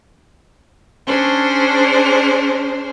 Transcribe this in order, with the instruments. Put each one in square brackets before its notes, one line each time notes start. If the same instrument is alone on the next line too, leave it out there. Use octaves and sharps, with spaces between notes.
[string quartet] C#4 D4 G#4 C5